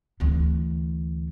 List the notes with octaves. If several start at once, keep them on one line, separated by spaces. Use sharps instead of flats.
D2 E3